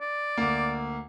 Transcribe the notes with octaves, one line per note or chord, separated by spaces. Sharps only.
D5
D2 A#3